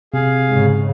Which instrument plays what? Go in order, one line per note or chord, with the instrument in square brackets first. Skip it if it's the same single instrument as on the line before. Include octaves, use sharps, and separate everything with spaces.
[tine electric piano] C3 [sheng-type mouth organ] G#4 F5
[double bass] G#2 C#3